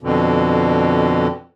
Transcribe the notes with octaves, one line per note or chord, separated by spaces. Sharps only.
F2 B2 D3